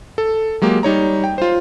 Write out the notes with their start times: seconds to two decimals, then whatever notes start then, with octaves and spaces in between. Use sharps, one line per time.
0.18 A4
0.62 F#3 G#3 A#3 G4
0.83 G3 D#4 C#5 A#5
1.24 G5
1.38 F4 C5